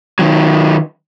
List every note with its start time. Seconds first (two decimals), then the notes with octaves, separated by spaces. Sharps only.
0.19 D#3 F#3